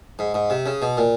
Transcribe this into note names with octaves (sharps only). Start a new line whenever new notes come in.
G#2
G#2
C3
C#3
B2
A#2